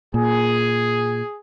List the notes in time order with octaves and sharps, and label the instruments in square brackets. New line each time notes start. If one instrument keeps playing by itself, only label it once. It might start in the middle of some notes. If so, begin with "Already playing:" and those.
[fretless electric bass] A#2 [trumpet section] G#4